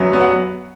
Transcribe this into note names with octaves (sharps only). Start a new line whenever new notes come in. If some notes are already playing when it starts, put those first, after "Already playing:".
Already playing: F#2 F#3 B3
F#3 B3
F#5